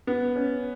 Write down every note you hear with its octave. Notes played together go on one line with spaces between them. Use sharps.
B3
C#4